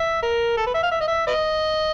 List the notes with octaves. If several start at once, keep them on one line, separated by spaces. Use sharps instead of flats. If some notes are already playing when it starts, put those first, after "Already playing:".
Already playing: E5
A#4
A4
B4
E5
F5
E5
D#5
E5
B4 D#5